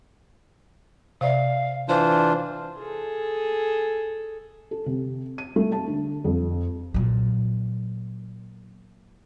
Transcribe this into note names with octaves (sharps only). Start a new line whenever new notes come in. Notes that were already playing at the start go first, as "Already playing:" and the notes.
C3 D5 E5 F5
E3 D4 F4 C5
G#4 A4
A4
C3
D#7
A3
A5
D3
F2
A#2 F#3